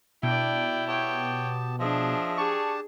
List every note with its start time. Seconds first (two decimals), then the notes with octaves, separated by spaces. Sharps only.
0.23 B2 D4 E4 D5 G5
0.87 B3 G4 C#5 G5 A5
1.80 F3 D4 G#4 D#5 E5
2.38 D4 G4 G#4 A5 C#6